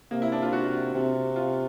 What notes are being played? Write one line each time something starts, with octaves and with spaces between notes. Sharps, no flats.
C3 A#3
E4
D4
F4
F#4
C3
F4